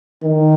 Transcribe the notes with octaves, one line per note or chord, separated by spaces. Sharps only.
D#3